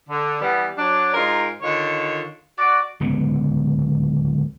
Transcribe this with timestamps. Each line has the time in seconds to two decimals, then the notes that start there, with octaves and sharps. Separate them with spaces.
0.09 D3
0.41 E3 G3 B3
0.78 F#3 D4
1.14 G#2 D#4 F4 A#4
1.62 D3 D#3 F4 C#5
2.59 F#4 D5
3.00 D1 C#2 D3 B3